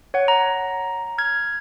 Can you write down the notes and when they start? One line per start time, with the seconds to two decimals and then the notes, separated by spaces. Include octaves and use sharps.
0.14 C#5 F#5
0.28 A#5
1.18 F6 G#6